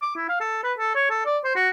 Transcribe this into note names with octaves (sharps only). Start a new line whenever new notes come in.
D6
E4
F5
A4
B4
A4
C#5
A4
D5
C5
F#4